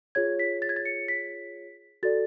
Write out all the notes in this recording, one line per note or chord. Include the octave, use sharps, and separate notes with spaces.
F4 G#4 C#5 G#6
B6
A6
G#6
A6
C#7
B6
F#4 A4 D5 A6